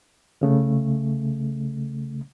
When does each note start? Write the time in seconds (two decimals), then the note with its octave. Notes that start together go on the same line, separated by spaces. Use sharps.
0.41 C2 C#3 A3